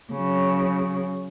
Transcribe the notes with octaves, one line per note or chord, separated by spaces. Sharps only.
C#3 F#3